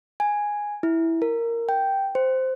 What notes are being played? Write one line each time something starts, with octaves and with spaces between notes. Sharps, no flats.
G#5
E4
A#4
G5
C5